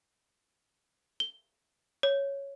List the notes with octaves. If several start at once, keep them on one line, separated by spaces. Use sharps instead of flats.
G7
C#5